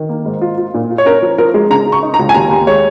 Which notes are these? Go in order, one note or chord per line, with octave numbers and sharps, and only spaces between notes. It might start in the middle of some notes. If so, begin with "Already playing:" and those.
Already playing: D#3
A#3
G#2
F4
F4
A#2
F4
C#5
C#4 A#4
F3
F3 A#4
G#3
C#3 A#5
C#3
C#6
D#4
A#5
C#2
G#5
D#2 A#5
D#2
G#3 C#5